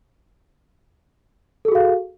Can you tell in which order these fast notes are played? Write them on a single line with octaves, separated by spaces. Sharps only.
A4 G#4 F#4 F5